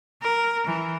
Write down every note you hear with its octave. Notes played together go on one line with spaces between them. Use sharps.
A#4
E3